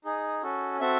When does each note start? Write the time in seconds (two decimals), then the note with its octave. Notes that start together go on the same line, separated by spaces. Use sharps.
0.05 D#4 G#4
0.43 C#4 F#4 A4
0.80 C4 F#4 A4 E5